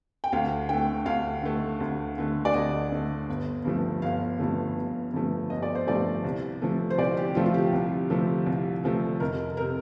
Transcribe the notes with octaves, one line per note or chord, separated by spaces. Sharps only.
G5
D2 F5
D3 A3 G5
D2 F5
D3 A3
D2
D3 A3
D5
D2 D#5
D3 A3
G1
G2 F3 A3
G1 F5
G2 F3 A3
G1
G2 F3 A3
G1 D#5
D5
C5
G2 F3 A3 D5
C2
C3 F3 A3
C5
C2 D5
G4
C3 F3 A3 F4
F4
G4
C2
C3 F3 A3
C2
C3 F3 A3
F1 A#4
C3 A#4